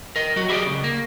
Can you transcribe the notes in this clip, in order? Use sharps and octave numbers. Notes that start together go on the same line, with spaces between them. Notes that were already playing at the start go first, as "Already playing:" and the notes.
A#4 D#5
F#3 F#4
E4 G4 G#4 C5 D5 D#5
C#2 C#3
A#3